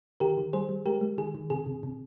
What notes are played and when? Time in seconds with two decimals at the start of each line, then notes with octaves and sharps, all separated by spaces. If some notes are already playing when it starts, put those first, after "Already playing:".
0.20 D#3 G4 A#4
0.37 D#3
0.53 G3 G#4 C5
0.69 G3
0.86 G#3 G4 A#4
1.01 G#3
1.18 D#3 G#4
1.35 D#3
1.50 C3 G#4
1.66 C3
1.83 C3